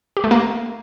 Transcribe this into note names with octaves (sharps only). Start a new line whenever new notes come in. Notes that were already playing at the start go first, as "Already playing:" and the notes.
G4
A3
A#3